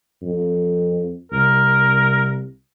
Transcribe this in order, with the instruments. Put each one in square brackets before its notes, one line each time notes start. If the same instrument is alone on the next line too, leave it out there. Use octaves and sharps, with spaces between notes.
[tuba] F2
[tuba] C2 [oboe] A#4